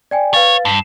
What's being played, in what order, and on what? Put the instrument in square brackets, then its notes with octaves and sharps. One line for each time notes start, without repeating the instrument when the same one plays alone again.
[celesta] D5 G5 G#5
[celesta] B4 F5 A6 [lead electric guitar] C#5
[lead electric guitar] G2 [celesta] C7 E7